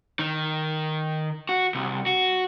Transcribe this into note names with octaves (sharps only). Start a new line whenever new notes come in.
D#3
F#4
C2
F#4